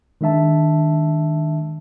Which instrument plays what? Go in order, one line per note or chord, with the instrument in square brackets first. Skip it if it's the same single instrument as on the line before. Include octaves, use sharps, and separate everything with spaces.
[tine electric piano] D#3 G#3 D4 E5 A5